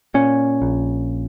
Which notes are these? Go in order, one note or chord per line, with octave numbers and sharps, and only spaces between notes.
A#2 C#4
A#1